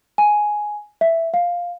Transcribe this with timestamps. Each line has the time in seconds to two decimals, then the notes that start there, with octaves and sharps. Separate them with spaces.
0.18 G#5
1.01 E5
1.34 F5